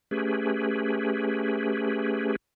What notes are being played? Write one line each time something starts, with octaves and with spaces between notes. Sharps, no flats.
A3 C#4 G4 G#4 B4